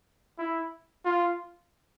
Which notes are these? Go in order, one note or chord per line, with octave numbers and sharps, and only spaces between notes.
E4
F4